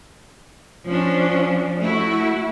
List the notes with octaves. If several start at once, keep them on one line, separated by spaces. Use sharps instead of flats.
F3 C#4 D4
A3 E4 F#4